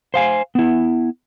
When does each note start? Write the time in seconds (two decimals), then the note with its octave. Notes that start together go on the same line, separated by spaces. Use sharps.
0.14 C5 F5 G#5
0.55 B3 E4